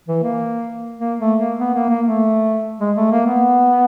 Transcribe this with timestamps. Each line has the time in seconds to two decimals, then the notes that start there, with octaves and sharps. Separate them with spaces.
0.08 E3
0.23 A#3
0.99 A#3
1.20 A3
1.39 A#3
1.60 B3
1.74 A#3
1.89 A#3
2.06 A3
2.80 G#3
2.97 A3
3.11 A#3
3.27 B3